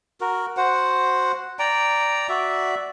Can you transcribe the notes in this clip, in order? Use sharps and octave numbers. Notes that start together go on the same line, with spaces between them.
F#4 A#4
F#4 C5 F#5
D5 G5 A#5
F#4 D5 E5